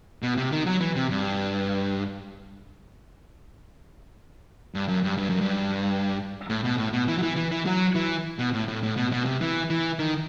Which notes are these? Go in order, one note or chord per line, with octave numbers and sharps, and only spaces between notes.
B2
C3
D#3
F#3
E3
C3
G2
G2
F#2
G2
G2
F#2
G2
A2
B2
A2
B2
E3
F#3
E3
E3
E3
F#3
E3
B2
A2
A2
A2
B2
B2
C3
E3
E3
D#3